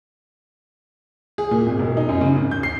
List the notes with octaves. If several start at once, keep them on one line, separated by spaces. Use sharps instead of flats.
G#4
A#2
G#1
E1
D#4
F#2
C#3
G#1
G6
C7